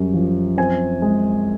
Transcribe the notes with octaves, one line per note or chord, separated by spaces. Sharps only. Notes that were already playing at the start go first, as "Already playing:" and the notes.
Already playing: F#2 G3
F3
C4 G#5
G#3